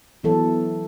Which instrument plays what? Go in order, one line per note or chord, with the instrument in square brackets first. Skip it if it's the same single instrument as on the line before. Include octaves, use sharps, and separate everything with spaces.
[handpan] E3 F#3 A4 [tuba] B3